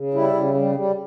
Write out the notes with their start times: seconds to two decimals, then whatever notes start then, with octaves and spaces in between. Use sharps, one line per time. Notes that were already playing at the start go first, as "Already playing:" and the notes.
Already playing: C#3
0.14 G3 E4
0.34 C#3
0.54 G3
0.75 G3